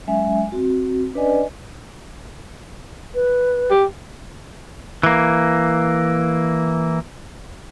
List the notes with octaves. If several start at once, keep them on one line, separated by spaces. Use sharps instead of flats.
F#3 G#3 C#4 E5 G#5
C4 F#4
C#4 D4 B4 D5 D#5 G#5
B4
G4
E3 A#3